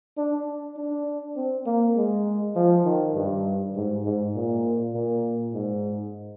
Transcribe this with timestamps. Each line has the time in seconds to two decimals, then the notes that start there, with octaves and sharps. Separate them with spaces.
0.17 D4
0.77 D4
1.36 C4
1.66 A#3
1.97 G#3
2.56 F3
2.85 D#3
3.15 G2
3.75 G#2
4.04 G#2
4.35 A#2
4.94 A#2
5.53 G#2